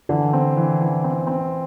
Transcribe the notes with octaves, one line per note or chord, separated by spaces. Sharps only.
D3 E3
C4
E3
E3
C4
C4